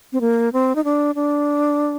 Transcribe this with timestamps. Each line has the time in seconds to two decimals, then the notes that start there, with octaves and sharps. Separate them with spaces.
0.13 C4
0.21 A#3
0.53 C4
0.75 D#4
0.84 D4
1.15 D4